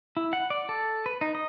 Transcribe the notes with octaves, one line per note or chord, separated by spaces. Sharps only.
E4
F#5
D5
A4
B4
D#4
D#5